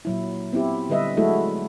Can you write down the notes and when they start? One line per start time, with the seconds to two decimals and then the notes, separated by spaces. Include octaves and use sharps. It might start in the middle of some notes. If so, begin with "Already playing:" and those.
0.05 A#2 F#3 E4
0.53 B3 C4 E4 G4
0.89 D3 G3 B4 D#5 E5
1.17 F#3 G#3 A3 E4 F#4 A4